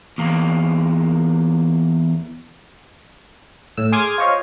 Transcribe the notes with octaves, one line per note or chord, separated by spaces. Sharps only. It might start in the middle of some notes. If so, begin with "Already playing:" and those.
E2 A#3
A2 E6
G#4 C6 D6 D#6 F6 G#6
F4 C5 C#5 D#5 F5